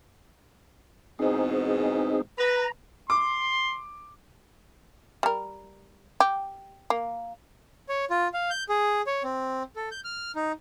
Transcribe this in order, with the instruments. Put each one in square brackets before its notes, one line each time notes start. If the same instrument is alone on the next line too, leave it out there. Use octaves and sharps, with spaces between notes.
[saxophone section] E2 G#2 B2 [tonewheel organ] C4 D#4 G#4
[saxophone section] B4 [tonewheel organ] A#5
[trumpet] C6 [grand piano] D6
[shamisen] G3 A#4
G4
A#3
[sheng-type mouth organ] C#5
F4
F5
G6
G#4
C#5
C4
A4
G6
F6
D#4